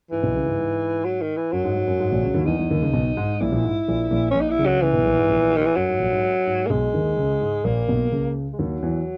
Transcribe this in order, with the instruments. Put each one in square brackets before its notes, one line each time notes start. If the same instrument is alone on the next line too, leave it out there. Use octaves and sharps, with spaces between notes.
[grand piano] G#2 [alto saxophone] E3
[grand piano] B1 B2
C#2 C#3
G#2
G#2
[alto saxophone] F#3
D#3
E3
[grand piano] F#2 [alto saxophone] F#3
[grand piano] G#2
G#2
F#2
G#2
A#1 A#2
C#2 C#3
D#2 D#3
[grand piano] E2 E3 [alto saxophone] D#4
[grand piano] E2 E3
D#2 D#3
C#2 C#3
B1 B2
G#2
[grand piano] A#1 A#2 [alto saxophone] E4
[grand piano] A#1 A#2
G#2
A#1 A#2
A#1 A#2
[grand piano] A#1 A#2 [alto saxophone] C#4
[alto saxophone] D#4
E4
[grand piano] C#2 C#3
[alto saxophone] F#3
[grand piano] C#2 C#3 [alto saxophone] E3
[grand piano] B1 B2
A#1 A#2
G#2
A#1 A#2
[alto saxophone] D#3
E3
[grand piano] F#2 [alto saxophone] F#3
[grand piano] G#2
A#1 A#2
G#2
G#2
[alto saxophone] A#3
[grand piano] B1 B2 [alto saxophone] G#3
[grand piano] D#2 D#3
C#2 C#3
G#2
[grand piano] A#1 A#2 [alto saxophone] A#3
[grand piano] B1 B2
C#2 C#3
[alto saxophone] G#3
[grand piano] D#2 D#3 [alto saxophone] F#3
[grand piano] E2 E3